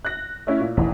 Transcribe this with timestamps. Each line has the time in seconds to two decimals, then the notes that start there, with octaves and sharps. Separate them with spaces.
0.05 F#6 A#6
0.47 A3 C#4 E4
0.60 A#2
0.77 E1 A1 E2 D#3